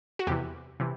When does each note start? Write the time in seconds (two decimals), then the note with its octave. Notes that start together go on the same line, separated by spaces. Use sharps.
0.19 F#4
0.27 E2 C3 E3 G4
0.80 C3 E3